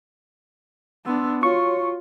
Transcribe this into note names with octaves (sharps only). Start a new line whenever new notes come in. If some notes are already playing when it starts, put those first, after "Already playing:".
B3 D4 C6 E6
F4 F#4 C#5 C6 C#6